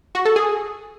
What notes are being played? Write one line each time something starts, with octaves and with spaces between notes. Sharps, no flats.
F#4
A4
G#4